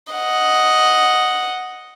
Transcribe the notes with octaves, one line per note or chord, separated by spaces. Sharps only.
D#5 F#5